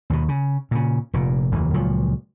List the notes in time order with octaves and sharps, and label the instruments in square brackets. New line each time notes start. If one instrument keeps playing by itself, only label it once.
[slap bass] D#2 B2
C#3
A#2 C#3
F1 A#2
F1 D#2 E3
C#2 A#2 F3 F#3